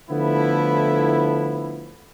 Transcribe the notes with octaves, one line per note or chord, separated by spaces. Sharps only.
D3 F3 A3 B3 E4